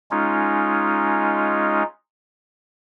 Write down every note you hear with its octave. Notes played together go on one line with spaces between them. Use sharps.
G#3 C#4 D#4 F4